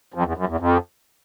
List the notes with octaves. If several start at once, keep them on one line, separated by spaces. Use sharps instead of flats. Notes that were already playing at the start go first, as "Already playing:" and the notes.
F2
E2
F#2
E2
F2